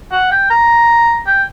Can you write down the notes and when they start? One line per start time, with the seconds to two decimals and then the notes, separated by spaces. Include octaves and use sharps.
0.12 F#5
0.31 G5
0.50 A#5
1.26 G5